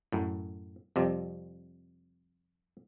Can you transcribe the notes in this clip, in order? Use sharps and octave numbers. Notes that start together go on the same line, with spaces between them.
F#2 A2
F2 C3 G3